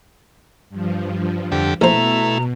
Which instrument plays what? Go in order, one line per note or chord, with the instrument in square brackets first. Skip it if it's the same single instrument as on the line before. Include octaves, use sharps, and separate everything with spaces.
[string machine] G2 F3
[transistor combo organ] F2 D3 G4
[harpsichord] A#1 C5 [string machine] B2 [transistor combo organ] A3 E4 [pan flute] A#5